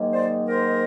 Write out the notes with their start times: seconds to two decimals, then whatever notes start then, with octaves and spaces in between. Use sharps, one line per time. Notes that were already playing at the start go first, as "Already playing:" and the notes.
Already playing: G#2 D#3 F#3 A#3
0.11 C5 D5
0.45 A#4 C5